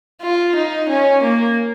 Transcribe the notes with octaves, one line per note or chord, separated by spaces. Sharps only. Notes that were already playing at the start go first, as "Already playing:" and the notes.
F4
D#4
C#4
A#3